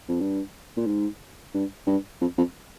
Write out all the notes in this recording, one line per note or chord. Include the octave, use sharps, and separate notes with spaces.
F2
G2
A#2
G#2
G2
G2
F2
F2